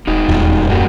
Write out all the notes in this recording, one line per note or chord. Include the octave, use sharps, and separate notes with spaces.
D#1 G#2 D#4 F#4
D#1 E2
F#2 G3 A#3 F#4